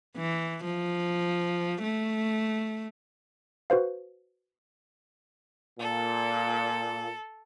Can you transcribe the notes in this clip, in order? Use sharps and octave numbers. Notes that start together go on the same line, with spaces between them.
E3
F3
A3
F#4 B4 C5 F5
A#2 A4